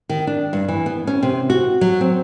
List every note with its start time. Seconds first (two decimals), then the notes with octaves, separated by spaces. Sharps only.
0.09 D#3
0.27 D4
0.53 G2
0.68 E3
0.86 B3
1.07 C#4
1.23 C3
1.50 F#4
1.81 F#3
2.01 C4